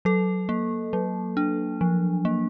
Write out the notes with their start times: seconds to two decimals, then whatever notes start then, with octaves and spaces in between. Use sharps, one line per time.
0.05 F#3 A4
0.49 A#3
0.93 F#3
1.37 D4
1.81 F3
2.25 A#3